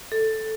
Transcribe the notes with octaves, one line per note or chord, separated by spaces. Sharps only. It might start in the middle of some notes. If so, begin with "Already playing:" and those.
A4